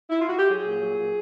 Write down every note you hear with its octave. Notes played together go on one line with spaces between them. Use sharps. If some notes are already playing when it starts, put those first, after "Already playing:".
E4
F4
F#4
G4
F#3 G#4
A#2
F#3
A#2